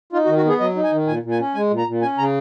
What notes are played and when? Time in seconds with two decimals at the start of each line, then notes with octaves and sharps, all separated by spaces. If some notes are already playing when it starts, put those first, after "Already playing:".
0.13 D#4 F4
0.25 F#4
0.28 D#3
0.37 F#4
0.45 B3 G#4
0.60 F#3 D#5
0.76 D#4
0.84 G#5
0.91 D#3
1.07 A#2 G#5
1.23 A#2
1.31 G#5
1.39 C#4
1.54 G#3 G#5
1.70 A#2
1.78 A#5
1.86 A#2
2.02 C#4 G#5
2.18 C#3 A#5